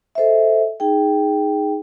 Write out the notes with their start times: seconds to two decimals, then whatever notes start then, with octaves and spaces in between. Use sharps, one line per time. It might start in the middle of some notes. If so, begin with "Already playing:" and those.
0.15 A4 C5 D#5 E5
0.80 D#4 G#4 G5